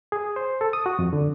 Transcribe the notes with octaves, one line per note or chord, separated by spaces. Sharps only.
G#4
C5
A4
D#6
F#4
F2
D3